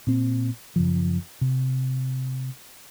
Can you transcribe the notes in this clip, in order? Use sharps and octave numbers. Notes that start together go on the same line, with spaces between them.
A#2 C4
F#2 C#3 F3
C3